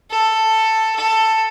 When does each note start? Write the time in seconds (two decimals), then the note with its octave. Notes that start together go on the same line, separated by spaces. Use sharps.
0.11 A4
0.95 A4